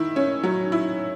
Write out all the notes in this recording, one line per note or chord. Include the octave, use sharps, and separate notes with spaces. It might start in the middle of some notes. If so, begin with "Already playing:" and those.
Already playing: D#3 E4
C#4
F#3
E4